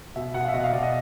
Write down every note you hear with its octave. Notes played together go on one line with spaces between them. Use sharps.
B2 E5
B2 F#5
F5
E5
B2 D#5
F5
B2 D5
D#5